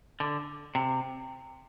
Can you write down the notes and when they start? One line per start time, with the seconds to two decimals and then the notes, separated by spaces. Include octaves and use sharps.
0.20 D3
0.75 C3